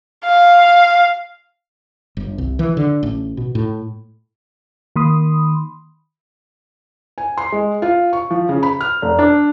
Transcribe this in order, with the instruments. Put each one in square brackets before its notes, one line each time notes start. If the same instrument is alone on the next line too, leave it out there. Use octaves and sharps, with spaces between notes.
[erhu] F5
[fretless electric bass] G1
C2
E3
D3
A1
B2
A2
[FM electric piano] D#3 A#3 B5 C6 D#6
[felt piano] G#5
C6
G#3
F4
C#6
F3
C#3
B5
F6
F1
D4